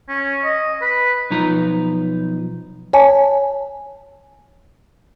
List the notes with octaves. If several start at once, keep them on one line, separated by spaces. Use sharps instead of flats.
C#4
D#5
B4
B1 F3 D#4 B4 A#5
C#5 G#5 A5